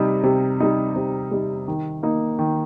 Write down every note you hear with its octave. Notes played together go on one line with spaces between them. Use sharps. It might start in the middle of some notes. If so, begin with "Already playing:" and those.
Already playing: C3 G3 D#4
C3
G3 D#4
C3
G3 D#4
D#3
A#3 D#4
D#3